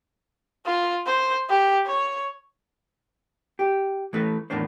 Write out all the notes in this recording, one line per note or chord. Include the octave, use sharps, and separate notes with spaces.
F4
C5
G4
C#5
G4
E3 A3 B4
E2 A2 D#3 D4 C5